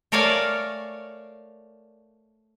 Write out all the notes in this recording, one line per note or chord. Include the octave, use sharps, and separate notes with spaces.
A3 A#4 C#5 D5 F5 G#5